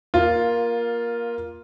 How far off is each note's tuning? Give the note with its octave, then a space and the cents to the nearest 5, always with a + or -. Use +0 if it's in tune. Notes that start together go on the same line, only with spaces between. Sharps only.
A#3 +15 F4 +0